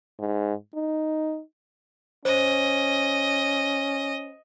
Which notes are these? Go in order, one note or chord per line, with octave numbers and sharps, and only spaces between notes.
G#2
D#4
C#4 C5 D#5